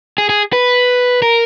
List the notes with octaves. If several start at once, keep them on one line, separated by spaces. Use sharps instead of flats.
G#4
G#4
B4
A#4